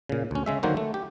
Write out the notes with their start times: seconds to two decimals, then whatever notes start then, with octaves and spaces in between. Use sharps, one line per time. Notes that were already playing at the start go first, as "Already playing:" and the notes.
0.09 A#2 C#3
0.31 D2 C#4
0.46 C#3 G#3 E5
0.63 D3 D#3 F#3 A#3 F#4 C5
0.77 A3
0.94 G4